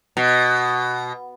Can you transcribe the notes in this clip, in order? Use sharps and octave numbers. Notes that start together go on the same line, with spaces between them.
B2